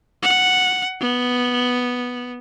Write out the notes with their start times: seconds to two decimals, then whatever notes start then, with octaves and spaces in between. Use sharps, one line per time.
0.22 F#5
1.00 B3